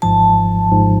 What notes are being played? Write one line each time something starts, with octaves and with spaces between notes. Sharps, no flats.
G#1 G#2 F3 A5
G#1 G#2 F3